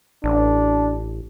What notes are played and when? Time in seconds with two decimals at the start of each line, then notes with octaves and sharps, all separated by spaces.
0.24 A1 D4